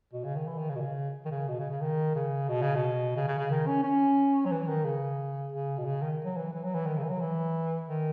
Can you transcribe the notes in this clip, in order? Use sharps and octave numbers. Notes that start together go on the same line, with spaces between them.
B2
C#3
D#3
E3
D#3
C#3
B2
C#3
D#3
C#3
B2
C#3
C#3
D#3
C#3
B2
C#3
B2
C#3
C#3
C#3
D#3
C#4
C#4
F#3
E3
D#3
C#3
C#3
B2
C#3
D#3
F#3
E3
E3
F#3
E3
D#3
C#3
E3
F#3
E3
D#3